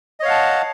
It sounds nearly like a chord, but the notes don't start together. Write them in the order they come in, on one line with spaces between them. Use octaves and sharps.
D#5 C#5 F5 F#5 A5